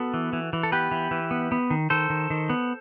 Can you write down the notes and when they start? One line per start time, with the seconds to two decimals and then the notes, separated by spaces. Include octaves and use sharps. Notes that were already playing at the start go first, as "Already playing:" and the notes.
Already playing: B3 F#4 A4
0.14 E3
0.33 E3
0.53 E3
0.63 A4
0.72 B3 G4 B4
0.91 E3
1.11 E3
1.31 B3
1.52 B3
1.70 D#3
1.90 D#3 A4 C5
2.10 D#3
2.30 D#3
2.50 B3